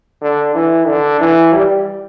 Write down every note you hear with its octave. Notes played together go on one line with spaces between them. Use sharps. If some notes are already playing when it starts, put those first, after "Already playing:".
D3
E3
D3
E3
G3